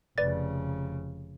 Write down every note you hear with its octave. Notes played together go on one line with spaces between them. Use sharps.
F1 C#3 B4 D5 A6